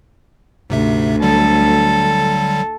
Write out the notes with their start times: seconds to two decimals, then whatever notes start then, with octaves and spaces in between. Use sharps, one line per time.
0.70 D2 G#2 C3 E5
1.22 D3 F#3 G3 A4